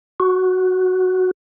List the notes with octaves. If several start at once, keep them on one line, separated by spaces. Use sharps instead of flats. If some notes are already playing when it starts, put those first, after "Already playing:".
F#4